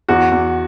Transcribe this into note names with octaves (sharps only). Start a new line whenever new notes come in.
E2 F#4
E2